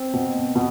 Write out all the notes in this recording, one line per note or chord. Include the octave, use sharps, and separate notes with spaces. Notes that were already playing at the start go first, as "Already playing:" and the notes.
Already playing: C4
B2
B2